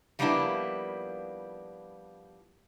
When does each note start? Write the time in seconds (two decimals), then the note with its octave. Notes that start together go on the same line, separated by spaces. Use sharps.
0.19 F3 G3 A#3 B3 D4 E4